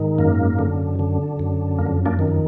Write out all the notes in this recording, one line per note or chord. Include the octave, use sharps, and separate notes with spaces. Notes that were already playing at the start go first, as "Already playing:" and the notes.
Already playing: G#2 D#3
F#2 A#3
D3
D3
F#2
F2 A#3
A#3 D4
D#3